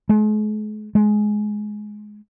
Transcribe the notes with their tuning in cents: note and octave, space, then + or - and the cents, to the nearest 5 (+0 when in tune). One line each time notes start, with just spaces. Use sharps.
G#3 +45
G#3 +15